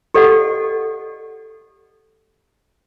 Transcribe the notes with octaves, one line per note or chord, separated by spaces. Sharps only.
G4 A4 D5 D#5 F#5